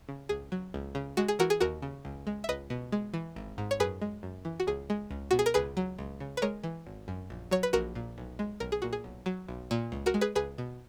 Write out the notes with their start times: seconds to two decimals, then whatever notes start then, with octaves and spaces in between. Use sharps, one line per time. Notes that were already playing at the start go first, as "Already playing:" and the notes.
0.09 C#3
0.29 C#2 G#4
0.52 F#3
0.74 C#2
0.95 C#3
1.17 G#3 F#4
1.28 G#4
1.39 E3 F#4 A#4
1.50 G#4
1.61 D#2 F#4 A#4
1.82 C#3
2.05 C#2
2.27 G#3
2.44 E5
2.49 C#2 B4 D#5
2.70 B2
2.92 G#3
3.14 E3
3.36 G#1
3.58 G#2
3.71 C#5
3.80 F#2 G#4 B4
4.02 G#3
4.23 F#2
4.45 E3
4.60 F#4
4.67 C#2 G#4
4.90 G#3
5.11 C#2
5.31 B2 F#4
5.39 G#4
5.46 A#4
5.54 C#2 G#4 B4
5.77 F#3
5.99 C#2
6.20 C#3
6.37 B4
6.42 G#3 A#4 C#5
6.63 E3
6.87 G#1
7.08 F#2
7.30 A#1
7.51 F#3 C#5
7.63 B4
7.73 A#1 F#4 A#4
7.95 A#2
8.18 B1
8.39 G#3
8.60 B1 A#4
8.72 G#4
8.82 A#2 F#4
8.93 G#4
9.04 B1
9.26 F#3
9.48 B1
9.71 A#2
9.92 C#2
10.06 F#4 A#4
10.14 G#3
10.21 G#4 B4
10.35 C#2 G#4 B4
10.58 B2